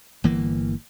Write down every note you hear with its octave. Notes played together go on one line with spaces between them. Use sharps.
G1 E3 A#3